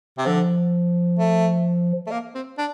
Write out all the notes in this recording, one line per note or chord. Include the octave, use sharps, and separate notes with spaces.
C3
D3 F3
A3
A3
A#3
C4
D4